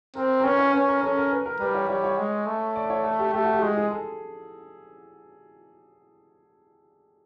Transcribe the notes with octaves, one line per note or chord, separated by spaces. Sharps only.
C4 A#4
A#4
C#4 B4
C#5
C#4 B4
A#4
C#4 A4
A#4
B4
A#4
G3 B4
C#5
G3 C#5
C#5
G#3
A3
D5
C#5
A4
G4
A3 G4
F#4
G4
G#3 G#4
G#4
A4